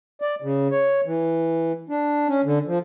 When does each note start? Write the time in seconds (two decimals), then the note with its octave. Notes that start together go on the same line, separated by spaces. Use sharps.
0.22 D5
0.42 C#3
0.71 C#5
1.06 E3
1.89 D4
2.28 C#4
2.44 D3
2.66 F3